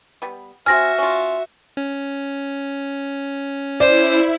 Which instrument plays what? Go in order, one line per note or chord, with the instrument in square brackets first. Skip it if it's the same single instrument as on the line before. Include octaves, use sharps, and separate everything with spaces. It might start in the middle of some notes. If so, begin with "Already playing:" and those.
[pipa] G3 B3
[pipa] C4 G#5 [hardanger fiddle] F#4 E5 [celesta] F6 A#6
[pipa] C#4 F4
[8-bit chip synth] C#4
[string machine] E4 [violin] C5 [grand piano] D5